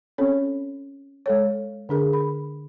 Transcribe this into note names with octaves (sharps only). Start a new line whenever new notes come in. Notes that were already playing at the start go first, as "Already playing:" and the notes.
C4 C#4 A4 C#5
G#3 A4 C#5
D3 D4 G#4 A#4
B5